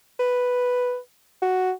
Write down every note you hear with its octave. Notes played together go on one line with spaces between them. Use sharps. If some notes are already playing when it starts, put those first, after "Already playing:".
B4
F#4